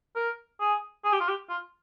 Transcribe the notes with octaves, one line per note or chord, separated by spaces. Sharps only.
A#4
G#4
G#4
G4
F4
G4
F4